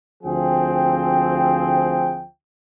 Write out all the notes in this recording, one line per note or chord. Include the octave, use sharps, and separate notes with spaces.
D2 F3 C4 G#4 G5